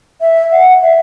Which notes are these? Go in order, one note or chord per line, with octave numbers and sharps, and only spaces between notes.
E5
F#5
E5